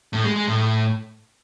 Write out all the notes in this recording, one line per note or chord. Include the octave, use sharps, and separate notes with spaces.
A2
G#3
G#3
A2